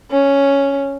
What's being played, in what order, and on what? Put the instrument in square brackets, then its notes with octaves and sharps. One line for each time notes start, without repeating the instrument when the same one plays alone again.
[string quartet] C#4